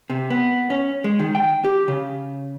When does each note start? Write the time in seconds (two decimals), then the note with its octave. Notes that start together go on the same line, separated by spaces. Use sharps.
0.10 C3
0.30 B3
0.70 C#4
1.04 G#3
1.19 D#3
1.35 G5
1.64 G4
1.88 C#3